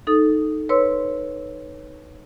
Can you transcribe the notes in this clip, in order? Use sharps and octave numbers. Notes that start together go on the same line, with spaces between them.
D#4 A4 D#6
B4 C#5 C6 E6